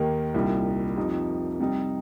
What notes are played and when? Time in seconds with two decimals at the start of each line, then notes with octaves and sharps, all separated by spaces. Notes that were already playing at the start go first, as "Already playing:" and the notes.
Already playing: D#2 D#3 A#3 G4
0.34 C2 A#2 G3 D#4
0.96 F2 F3 D#4 G4
1.59 C3 G3 D#4